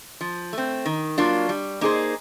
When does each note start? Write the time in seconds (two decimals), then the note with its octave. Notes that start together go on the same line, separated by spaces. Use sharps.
0.21 F3
0.53 A3 C4
0.86 D#3
1.18 F#3 A#3 D4 F4
1.49 G3
1.81 A#3 D#4 G#4 C5